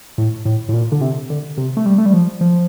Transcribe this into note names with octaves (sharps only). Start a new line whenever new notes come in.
A2
A2
A2
A#2
D3
C3
D3
C3
A3
G3
A3
G3
F3
F3